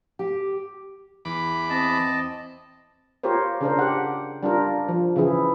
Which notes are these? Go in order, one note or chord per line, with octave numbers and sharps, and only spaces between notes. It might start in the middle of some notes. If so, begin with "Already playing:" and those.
G4
E2 B5 D6
C4 D#5 A5
F4 G4 A#4 C5 C#5
C#3 D4 A#4 C5
G4 F#5
G3 D4 F4 A#4
F3
C#3 E3 E4 G#4